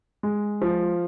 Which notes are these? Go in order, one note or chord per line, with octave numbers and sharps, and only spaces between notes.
G#3
F3